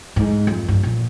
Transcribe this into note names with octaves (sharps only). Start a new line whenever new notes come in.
G#2
F2
G2
A#1